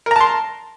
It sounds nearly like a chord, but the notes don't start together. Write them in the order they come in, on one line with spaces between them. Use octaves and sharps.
A#4 A#5 A5 C6